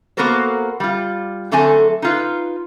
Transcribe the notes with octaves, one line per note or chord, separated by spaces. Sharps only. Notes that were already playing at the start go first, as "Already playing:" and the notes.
A#3 B3 F#4 A4 A#4 C5
G3 F4
D3 F#3 A3 C4 A4 G#5
D#4 F4 B4